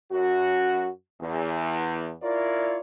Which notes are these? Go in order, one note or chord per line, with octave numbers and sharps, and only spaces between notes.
F#2 F#4
E2
E4 F4 A#4 C#5 D5